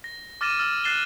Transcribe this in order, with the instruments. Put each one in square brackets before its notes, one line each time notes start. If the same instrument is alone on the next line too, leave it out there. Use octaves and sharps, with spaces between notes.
[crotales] A#6
D6 F6 A6 A#6 D#7 E7
E6 F6 A6
F#6 A6 C7 E7 G7